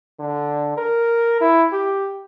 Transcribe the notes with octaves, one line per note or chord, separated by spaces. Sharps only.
D3
A#4
E4
G4